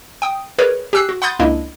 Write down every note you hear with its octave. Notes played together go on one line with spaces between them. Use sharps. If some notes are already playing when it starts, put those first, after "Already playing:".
G5 D#6
G#4 A#4 B4 C#5 D5
G4 G#5 E6 F#6 C7
F#4
F#5 B5 C6 D#6 G6 A6
C#2 A#3 D4 E4 D#5